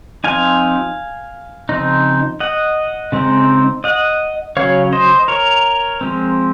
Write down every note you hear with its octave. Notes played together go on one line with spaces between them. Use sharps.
F3 C4 D#4 F5 G#5
C#3 F3 C4 D#4
D#5 F#5
C#3 G#3 C4 D#4
D#5 F#5
C#3 F#3 C#4 C#5 F5
C5 D#5
A#4 C#5
F3 G#3 C4